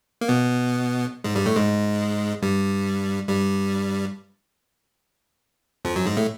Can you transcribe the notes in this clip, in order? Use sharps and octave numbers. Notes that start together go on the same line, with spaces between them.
A#3
B2 B3
G#2 G#3
G2 G3
A2 A3
G#2 G#3
G2 G3
G2 G3
F2 F3
F#2 F#3
G#2 G#3
A2 A3